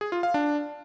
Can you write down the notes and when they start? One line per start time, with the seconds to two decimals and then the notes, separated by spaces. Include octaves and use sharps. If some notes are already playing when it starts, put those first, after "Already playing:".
0.01 G#4
0.12 F4
0.23 F5
0.34 D4